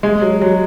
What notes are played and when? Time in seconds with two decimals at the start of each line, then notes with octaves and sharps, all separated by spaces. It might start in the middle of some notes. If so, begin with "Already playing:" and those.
0.03 G#3
0.22 F#3
0.42 F#3